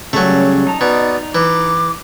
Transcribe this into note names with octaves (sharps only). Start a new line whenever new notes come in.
C#3 F#3 G3 A3 C#4
D#4 A5 A#5
B2 D5
E3 D6